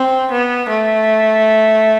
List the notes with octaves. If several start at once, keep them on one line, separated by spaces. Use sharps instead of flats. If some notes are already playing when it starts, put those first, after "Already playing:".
Already playing: C4
B3
A3